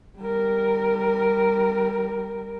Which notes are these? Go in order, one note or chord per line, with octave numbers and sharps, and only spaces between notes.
G3 A#4